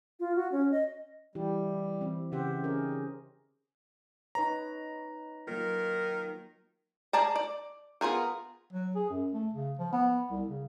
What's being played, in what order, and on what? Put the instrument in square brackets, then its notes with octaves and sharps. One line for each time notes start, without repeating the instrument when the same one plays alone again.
[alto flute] F4
F#4
C#4
D#5
[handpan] E3 E4 G4 [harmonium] G3
[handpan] E3 C4
[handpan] C#3 G4 C5 [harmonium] E5 F#5
[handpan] C#4 G#4 A#4 [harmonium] D#4
[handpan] D#4 B4 C#5 [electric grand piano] A#5
[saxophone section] D#3 A#4 [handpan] F#3 A#3 F4
[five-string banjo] G#4 D5 A5 A#5
D5
B3 F4 G#4 A#4
[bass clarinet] F#3
G#4
F#2
A3
C#3
F3
B3
C2
C#3